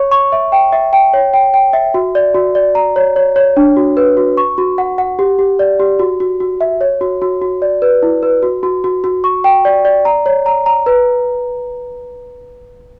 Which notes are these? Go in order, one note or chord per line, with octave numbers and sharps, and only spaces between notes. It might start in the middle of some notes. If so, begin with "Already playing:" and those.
Already playing: C#5 C#6
C#6
E5
G5
E5
G5
C#5
G5
G5
E5
F#4
D5
F#4
D5
A#5
C#5
C#5
C#5
D4
F#4
B4
F#4
C#6
F#4
F#5
F#5
G4
G4
D5
G4
F#4
F#4
F#4
E5
C#5
F#4
F#4
F#4
D5
B4
E4
B4
F#4
F#4
F#4
F#4
C#6
G5
D5
D5
A#5
C#5
A#5
A#5
B4